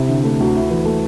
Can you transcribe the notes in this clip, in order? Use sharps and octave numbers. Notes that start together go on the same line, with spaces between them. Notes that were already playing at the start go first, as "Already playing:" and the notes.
Already playing: C3 E4
D3
A3
D2
E4
E3
A3